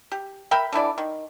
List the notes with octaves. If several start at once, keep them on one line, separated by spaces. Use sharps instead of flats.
G4
A#4 E5 G5 B5
D3 E3 E4 D5
D#3